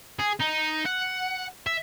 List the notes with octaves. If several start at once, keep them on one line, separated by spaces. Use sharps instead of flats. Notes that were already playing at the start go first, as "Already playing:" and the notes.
G#4
D#4
F#5
E5